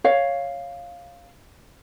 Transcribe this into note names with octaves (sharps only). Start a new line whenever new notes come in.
C#5 F5